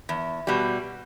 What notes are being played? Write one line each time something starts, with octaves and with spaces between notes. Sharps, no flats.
E2
B2 G3